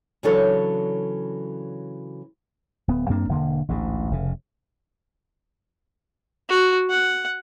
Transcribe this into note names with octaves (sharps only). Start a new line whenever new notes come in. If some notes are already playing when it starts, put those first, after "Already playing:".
C#3 E3 F#3 D4 A4 C#5
D1 B3
F#2 A#3 C4 D4
E1 D3 A#3
A1 D2 G#2
F1 C#3
F#4
F#5